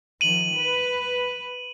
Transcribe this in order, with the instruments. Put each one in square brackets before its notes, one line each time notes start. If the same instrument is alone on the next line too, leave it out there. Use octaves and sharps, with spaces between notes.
[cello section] D#3 F3 [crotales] D#7 F#7
[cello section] B4